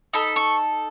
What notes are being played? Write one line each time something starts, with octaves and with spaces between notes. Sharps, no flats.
D#4 A4 B5
C#6